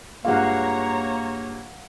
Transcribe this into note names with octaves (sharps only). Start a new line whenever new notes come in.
G2 G#3 A#3 F4 C#5 F5 F#5 A#5